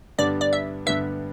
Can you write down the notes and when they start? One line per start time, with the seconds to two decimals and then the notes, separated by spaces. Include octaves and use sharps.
0.18 G2 D3 G3 B3 D4 D5
0.41 D5
0.53 E5
0.86 G2 D3 G3 B3 D4 E5